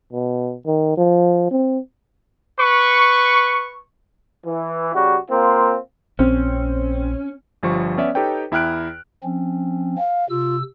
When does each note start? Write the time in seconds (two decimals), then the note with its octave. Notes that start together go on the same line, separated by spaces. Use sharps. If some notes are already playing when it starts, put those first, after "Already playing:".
0.12 B2
0.67 D#3
0.97 F3
1.51 C4
2.58 B4 C#6
4.45 E3
4.95 C#3 G3 F#4
5.31 A#3 C4 F4
6.19 A#1 C4 C#4
7.63 G1 F3 G3 C5 C#6
7.98 B3 C#4 D5 E5
8.15 D#4 G4 A4 B4 C#5 G5
8.52 E2 E4 G5 F6 F#6 D7
9.24 F3 C4 C#4
9.97 F5
10.29 C3 F4 E6